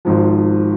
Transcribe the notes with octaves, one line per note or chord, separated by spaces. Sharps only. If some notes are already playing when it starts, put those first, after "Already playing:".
G#1 G#2 F3